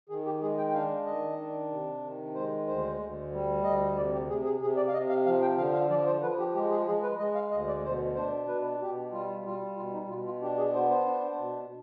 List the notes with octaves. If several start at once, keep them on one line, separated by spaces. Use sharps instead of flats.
D#3 G#4
G4
G#3 G#4
G5
G5
D4 F5
D#3 D#5
D4
C3
D#3
G#3 C5
D2 C5
D2
G3
D2 D#5
C3 D5
G4
C3 G#4
G#4
C3 G#4
D5
F5
C3 D#5
F5
F3 F5
G5
D3 F5
F5
F3 D5
C5
F3 B4
G4
G#3 G4
G#4
G#3 G#4
B4
G#3 D#5
F5
D2 D#5
D5
B2 C5
D4 C5
B2 B4
B2 G4
G3 F4
G3 F4
B2 F4
D#4
B2 F4
F4
D4 G4
G#4
B3 C5
C5
D4
B2